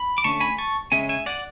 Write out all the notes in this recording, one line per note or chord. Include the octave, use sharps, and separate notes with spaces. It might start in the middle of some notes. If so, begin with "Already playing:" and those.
Already playing: B5
D6
D3 A3 C#4 A5 C#6
G#5 B5
A5 C#6
C#3 G#3 C#4 E5 G#5
E5 G#5
D5 F#5